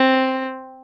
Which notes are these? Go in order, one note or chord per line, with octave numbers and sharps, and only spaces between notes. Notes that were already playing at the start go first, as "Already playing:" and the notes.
Already playing: C4